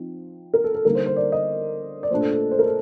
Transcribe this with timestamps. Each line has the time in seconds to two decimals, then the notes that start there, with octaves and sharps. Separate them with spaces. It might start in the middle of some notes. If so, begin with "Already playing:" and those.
Already playing: F3 C4 D#4
0.54 A#4
0.64 A4
0.75 A4
0.85 D3 G3 A#3 D#4 A#4
0.95 C5
1.06 C5
1.17 D5
1.32 D#5
2.03 D5
2.11 A#2 A3 D4 C5
2.21 A4
2.32 A4
2.51 C5
2.59 A#4
2.66 A4